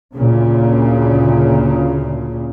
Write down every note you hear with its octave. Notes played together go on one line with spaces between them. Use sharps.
D2 A#2 C#3